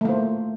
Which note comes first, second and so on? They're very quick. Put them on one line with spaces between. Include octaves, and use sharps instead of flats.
A3 A#3 C5